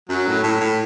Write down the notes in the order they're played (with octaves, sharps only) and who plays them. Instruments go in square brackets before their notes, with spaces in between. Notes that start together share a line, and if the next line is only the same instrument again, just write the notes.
[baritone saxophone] F#2 [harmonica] F#3
[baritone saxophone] A2
A2
A2